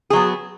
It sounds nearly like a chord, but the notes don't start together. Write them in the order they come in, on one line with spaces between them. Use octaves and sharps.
G#4 F#3 B3